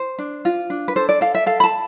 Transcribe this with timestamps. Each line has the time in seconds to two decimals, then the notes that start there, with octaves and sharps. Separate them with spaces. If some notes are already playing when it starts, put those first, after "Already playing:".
Already playing: C5
0.19 D4
0.45 F4
0.70 D4
0.88 B4
0.96 A4 C5
1.09 D5
1.21 A4 F5
1.35 E5
1.46 A4 F5
1.60 B5
1.64 A5